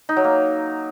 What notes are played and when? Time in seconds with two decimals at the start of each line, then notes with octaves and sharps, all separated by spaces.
0.09 D#4
0.17 F#3
0.24 A#3